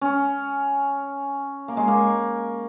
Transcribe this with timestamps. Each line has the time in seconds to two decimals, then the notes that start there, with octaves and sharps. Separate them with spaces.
0.01 C#4
1.68 A#3
1.77 G#3
1.88 A#3